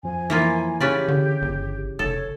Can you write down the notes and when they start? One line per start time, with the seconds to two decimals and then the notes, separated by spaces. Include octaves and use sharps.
0.03 F2 F3 G#5
0.30 E3 A#3 F4
0.80 C#3 C#4 G4 B4 D5
1.08 D3
1.42 G1
1.99 F1 A4 C#5